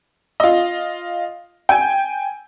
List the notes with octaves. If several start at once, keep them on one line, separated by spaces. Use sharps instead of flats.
F4 D#5
G5 G#5